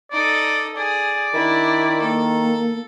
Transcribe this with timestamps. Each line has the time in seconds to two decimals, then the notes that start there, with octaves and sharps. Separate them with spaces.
0.12 D#4 A4 D5
0.76 G#4 D5
1.34 D#3 D4 E4
2.01 A#3 A4